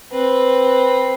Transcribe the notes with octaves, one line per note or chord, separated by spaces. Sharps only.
C4 B4